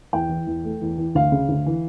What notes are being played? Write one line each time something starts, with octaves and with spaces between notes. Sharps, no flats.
E2 G5
E3
E2
A3
E2
E3
D2 F5
C#3
D2
E3